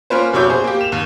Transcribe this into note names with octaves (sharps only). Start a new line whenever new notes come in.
A#3 C#4 F4 B4 C5
F1 B2 E4 C#5 D6 G6
G#4 C5
A#3 G4
E7 F7
D#2